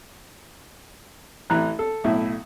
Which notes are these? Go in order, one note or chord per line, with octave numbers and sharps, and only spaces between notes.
A1 E3 A#5 F#6
A4
B1 A2 E4